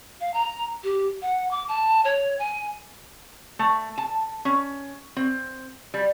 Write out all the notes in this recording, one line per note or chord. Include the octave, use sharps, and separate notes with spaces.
F5
A#5
G4
F#5
D6
A5
C#5
G#5
A3
A5
C#4
C4
G3